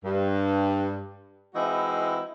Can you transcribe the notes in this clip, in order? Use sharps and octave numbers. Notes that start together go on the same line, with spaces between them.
G2
E3 G#3 C4 D#4 E4 F#4